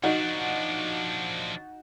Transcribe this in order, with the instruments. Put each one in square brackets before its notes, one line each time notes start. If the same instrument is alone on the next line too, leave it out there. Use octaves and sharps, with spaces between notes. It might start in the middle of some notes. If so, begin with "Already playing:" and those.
[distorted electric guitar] F3 D4 [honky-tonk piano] D#4 F#4